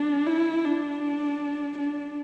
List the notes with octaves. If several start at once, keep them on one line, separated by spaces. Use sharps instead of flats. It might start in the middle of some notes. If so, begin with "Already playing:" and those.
Already playing: D4
E4
D4
D4